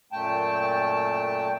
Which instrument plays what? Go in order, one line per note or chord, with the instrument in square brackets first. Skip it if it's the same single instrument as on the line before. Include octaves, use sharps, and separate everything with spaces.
[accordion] F#2 A#2 A3 G5 A5